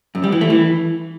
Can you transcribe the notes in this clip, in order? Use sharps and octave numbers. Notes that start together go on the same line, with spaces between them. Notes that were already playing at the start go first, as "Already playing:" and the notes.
F#2
G3
E3
A3
E3